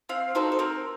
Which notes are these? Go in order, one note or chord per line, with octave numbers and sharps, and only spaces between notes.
C4 F5
D#4 F#4 A4 C5
A4
C4 A#4